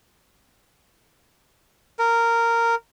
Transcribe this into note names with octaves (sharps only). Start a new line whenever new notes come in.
A#4